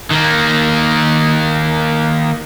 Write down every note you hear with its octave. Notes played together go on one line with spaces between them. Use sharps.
D#3 A#3